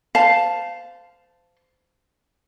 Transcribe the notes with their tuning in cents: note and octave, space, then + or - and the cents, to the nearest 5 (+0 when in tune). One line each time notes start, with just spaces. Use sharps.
C5 -25 F5 +0 A5 +0